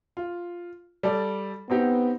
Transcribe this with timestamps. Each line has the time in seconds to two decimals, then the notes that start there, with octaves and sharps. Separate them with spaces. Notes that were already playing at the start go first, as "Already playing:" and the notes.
0.17 F4
1.03 G3 A4 D5
1.70 B3 C4 D#4 G4